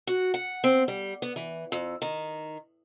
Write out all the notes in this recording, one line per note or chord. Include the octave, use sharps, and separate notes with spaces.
F#4
F#5
C4
G3
B3
E3
F2
D#3